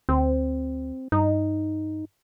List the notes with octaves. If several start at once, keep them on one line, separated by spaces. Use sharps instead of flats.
D2 C4
G2 D#4